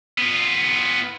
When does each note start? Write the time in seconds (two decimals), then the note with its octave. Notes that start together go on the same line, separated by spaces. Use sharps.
0.18 B3 F4